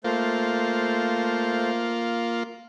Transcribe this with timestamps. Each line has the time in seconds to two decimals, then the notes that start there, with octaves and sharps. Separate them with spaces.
0.05 A3 A#3 F4 C5